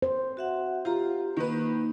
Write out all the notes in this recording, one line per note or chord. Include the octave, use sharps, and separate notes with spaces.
C5
F#4 E5 F#5
F4 G4 A#5
D#3 A#3 D#4 B4